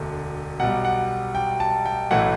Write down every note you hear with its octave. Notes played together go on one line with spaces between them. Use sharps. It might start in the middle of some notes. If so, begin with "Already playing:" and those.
Already playing: E1 D2 D3 A3
B1 B2 G3 F#5
F#5
G5
A5
G5
B1 A2 E3 A3 F#5